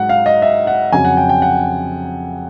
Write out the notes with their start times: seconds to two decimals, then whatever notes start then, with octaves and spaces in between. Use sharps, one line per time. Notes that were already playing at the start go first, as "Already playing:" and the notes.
Already playing: G#2 F#3 F#5
0.09 F5
0.26 D#5
0.42 E5
0.67 F#5
0.92 F2 C#3 F#3 G#5
1.05 F#5
1.17 G5
1.29 G5
1.42 F#5